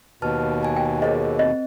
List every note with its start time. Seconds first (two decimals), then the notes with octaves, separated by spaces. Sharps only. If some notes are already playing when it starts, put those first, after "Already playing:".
0.22 D#2 B2 B4 A5 F6
0.63 G#5 A5
0.76 G5
1.02 G#4 A#4 C5 C#5 D#5
1.39 C4 D#5